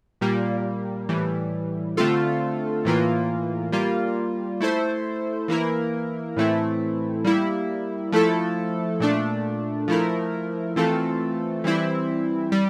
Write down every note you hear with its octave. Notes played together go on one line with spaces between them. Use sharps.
A#2 G3 A#3
A2 E3 G3
D3 A3 C4 F4 A4
A2 E3 A#3 F4
G3 A#3 F4
A3 E4 A4 C5
E3 A#3 E4 A#4
A2 E3 A3 C4 E4
G3 A#3 E4
F3 A3 E4 A4
A#2 A3 D4
F3 A3 E4 A#4
E3 A3 C4 F4 A4
E3 G3 C4 E4
G3